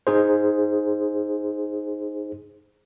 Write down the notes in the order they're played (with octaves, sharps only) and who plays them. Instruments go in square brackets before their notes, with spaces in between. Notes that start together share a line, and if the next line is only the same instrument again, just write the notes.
[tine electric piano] D#4 G#4 C5